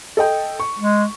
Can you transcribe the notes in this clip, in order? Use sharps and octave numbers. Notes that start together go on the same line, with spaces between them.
A4 D#5 G5
C#6
G#3